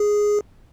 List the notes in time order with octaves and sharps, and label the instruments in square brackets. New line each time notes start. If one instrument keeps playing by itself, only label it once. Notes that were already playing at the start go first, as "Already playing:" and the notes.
Already playing: [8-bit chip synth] G#4